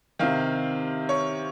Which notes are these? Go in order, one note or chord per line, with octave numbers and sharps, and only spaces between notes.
C3 D#3 F5
C#5